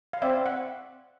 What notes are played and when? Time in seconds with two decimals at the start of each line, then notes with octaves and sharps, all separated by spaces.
0.13 F5
0.22 C4 D5 E5
0.46 F#5